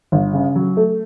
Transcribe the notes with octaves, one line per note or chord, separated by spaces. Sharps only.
G1
C#3
F#3
A3